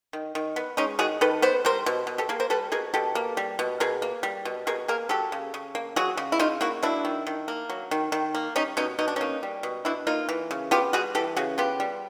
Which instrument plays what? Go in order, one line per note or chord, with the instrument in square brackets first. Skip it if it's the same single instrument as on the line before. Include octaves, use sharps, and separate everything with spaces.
[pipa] D#3
D#3
B3
G#3 C#4 D#4
D#3 F#4 G#4
D#3 A4 B4
B3 C5
G3 A#4 C5
B2
B2
G4 A4
A#3 G#4 A#4
A#4 C5
G3 A4 B4
B2 G#4 A#4
B2 G4 A4
A#3
G3
B2
B2 G#4 A#4
A#3
G3
B2
B2 G#4 A#4
A#3 G#4 A#4
F#3 G4 A4
C#3
C#3
A#3
F#3 F#4 G#4
C#3
E4
C#3 D#4 F4
A#3 E4 F#4
F#3 D4 E4
D#3
D#3
A#3
F#3
D#3
D#3
A#3
G3 C#4 D#4
B2 C#4 D#4
B2 D#4
D4
A#3 C#4 D#4
G3
B2
B2 D4 E4
A#3 D#4 F4
E3
C#3
B3 F4 G4
G3 F#4 G#4
E3 G4 A4
C#3 F#4 G#4
B3 F4 G4
G3